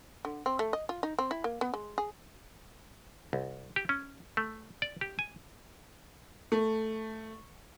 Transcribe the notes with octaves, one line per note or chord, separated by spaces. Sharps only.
D3
C4
A3
D#5
F4
D#4
C4
E4
A#3
B3
G#3
G#4
C2
G4
C#4
A3
D5
G4
G#5
A3